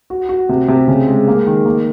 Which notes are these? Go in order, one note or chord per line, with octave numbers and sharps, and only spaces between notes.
F#4
F#4
C3
C3
C#3
G#3
A#3
D#3
A#3